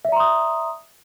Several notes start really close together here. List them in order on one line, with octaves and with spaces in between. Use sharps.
E5 D5 A#5 C6 D#6